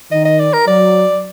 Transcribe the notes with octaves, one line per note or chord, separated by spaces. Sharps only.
D#3 D#5
D#5
D5
A#4
F#3 D5